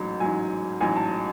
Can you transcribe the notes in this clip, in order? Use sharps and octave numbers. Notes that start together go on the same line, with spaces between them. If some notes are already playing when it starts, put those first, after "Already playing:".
Already playing: A1 G#2 F#3
A1 G#2 F#3 G#5
A1 G#2 F#3 G#5
A5